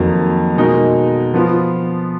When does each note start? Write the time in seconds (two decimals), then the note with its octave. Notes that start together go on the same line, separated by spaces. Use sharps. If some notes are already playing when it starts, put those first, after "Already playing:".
Already playing: F2 D#3 F#3 A#3
0.56 B2 G#3 D#4 F#4 A#4
1.34 F3 B3 F4